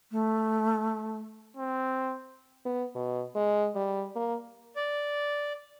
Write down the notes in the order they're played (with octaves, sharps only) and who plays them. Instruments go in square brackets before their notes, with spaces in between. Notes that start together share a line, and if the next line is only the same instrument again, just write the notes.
[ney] A3
[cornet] C4
[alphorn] B3
B2
G#3
G3
A#3
[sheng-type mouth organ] D5